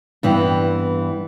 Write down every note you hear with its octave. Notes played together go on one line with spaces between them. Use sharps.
G2 E3 B3 C4